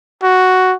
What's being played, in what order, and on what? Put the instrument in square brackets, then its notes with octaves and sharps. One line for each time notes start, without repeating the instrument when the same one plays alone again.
[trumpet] F#4